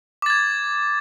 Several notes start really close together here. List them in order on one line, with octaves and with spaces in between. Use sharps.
D6 A6 G#6